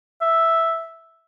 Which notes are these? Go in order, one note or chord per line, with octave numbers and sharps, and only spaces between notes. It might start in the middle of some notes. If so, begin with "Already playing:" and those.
E5